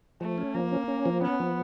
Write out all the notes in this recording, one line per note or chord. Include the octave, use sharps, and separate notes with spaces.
F3 A3
C#4
F3 A#3
C#4
C#4
F3
B3 C#4
F3